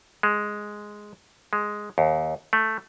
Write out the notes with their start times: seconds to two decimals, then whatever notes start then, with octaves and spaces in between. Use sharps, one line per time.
0.23 G#3
1.53 G#3
1.98 D#2
2.53 A3